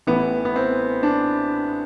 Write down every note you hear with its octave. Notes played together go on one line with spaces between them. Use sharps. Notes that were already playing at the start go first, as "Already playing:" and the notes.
A1 A2 E3 B3
B3
C4
D4